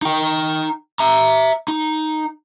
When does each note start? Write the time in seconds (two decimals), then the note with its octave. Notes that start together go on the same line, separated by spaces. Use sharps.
0.02 D#4 G5
0.99 E5 A#5
1.68 D#4